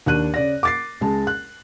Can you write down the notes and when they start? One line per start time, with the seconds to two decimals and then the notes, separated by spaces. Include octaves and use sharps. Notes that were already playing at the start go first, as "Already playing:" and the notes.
0.06 D#2 D4 F#6 D#7
0.34 C#3 D5 A#6
0.63 D6 A6 C7
1.01 C#2 G#3 A5
1.27 F#6